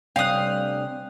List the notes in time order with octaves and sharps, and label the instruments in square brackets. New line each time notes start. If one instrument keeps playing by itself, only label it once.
[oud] D2 G3 C#4 [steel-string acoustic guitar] C3 [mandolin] F5 D#6 [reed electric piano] G5 F#6